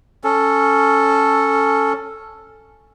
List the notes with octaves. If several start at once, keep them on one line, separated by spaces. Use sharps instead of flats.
C#4 A4